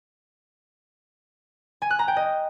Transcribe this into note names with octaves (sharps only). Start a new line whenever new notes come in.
G#5
F#6
A#5
G5
D#5